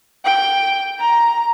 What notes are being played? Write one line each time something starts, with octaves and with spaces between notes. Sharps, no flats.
G5
A#5